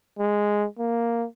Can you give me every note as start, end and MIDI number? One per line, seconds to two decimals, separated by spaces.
0.19 0.65 56
0.78 1.25 58